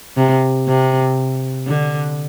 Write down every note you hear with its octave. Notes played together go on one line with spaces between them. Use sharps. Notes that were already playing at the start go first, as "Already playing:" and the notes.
C3
C3
D3